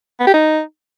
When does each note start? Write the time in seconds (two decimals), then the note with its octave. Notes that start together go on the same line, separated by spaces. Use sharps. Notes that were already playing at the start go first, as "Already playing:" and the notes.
0.20 B3
0.27 G4
0.34 D#4